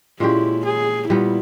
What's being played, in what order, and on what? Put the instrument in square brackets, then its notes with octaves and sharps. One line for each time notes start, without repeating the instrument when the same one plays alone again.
[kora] A#2 G#3 C#4 G4 [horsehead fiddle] E4
[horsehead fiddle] G#4
[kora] A#2 G3 B3 [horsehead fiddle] E4